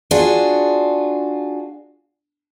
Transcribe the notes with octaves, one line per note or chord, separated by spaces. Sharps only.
D4 F4 F#4 G#4